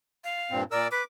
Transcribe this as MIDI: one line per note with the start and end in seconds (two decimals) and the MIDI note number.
0.24 0.61 77
0.51 0.64 43
0.51 0.64 46
0.51 0.64 60
0.72 0.87 46
0.72 0.87 70
0.72 0.88 74
0.72 0.87 88
0.91 1.02 71
0.91 1.04 86